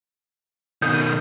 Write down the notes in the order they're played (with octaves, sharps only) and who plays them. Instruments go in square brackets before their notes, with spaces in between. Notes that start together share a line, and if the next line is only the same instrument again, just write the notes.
[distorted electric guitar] B2 D#3 [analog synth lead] D#6 [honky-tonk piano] G6